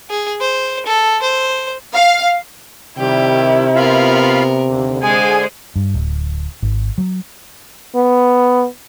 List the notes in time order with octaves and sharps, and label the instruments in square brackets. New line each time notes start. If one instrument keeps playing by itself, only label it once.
[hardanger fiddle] G#4
C5
A4
C5
[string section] F5
[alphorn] C3 [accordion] D#3 G3 [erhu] E4 [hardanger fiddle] G4
[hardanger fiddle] B3 A#4 [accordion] F4 F5 B5
[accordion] D#2 D3
[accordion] D3 G#4 [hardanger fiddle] G#3 C5 [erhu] G#5
[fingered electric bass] G2
D1
G#1
F#3
[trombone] B3